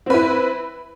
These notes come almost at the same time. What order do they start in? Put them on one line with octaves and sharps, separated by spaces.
C4 B4 E4